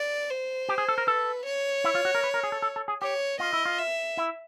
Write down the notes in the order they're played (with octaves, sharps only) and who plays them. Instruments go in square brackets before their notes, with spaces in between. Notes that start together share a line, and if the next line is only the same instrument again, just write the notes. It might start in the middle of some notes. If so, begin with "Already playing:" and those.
Already playing: [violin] D5
C5
[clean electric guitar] G4
G#4
A4
A#4
[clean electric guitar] A4 [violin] B4
[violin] C#5
[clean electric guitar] E4
F4
F#4
A#4
B4
A#4
G#4
A4
A4
A4
G#4
[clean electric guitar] G4 [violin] C#5
[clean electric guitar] F4 [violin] D#5
[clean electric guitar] E4
F4
[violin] E5
[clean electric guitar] E4